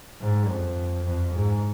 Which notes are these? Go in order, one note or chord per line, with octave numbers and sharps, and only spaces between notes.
G#2
F2
F2
G#2